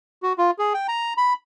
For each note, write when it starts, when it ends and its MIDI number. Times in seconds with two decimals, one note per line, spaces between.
0.23 0.33 66
0.38 0.51 65
0.59 0.73 68
0.74 0.87 79
0.88 1.13 82
1.17 1.33 83